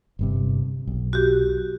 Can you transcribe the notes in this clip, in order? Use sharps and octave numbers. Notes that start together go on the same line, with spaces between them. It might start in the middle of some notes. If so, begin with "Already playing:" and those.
G1 G2 C3
B1
F#4 G4